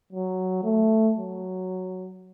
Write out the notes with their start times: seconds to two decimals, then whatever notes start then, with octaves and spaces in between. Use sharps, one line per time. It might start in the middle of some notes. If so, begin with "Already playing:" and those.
0.13 F#3
0.63 A3
1.16 F#3